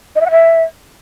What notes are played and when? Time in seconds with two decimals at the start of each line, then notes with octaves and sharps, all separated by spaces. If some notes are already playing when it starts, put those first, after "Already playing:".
0.16 D#5
0.21 E5
0.26 F#5
0.31 E5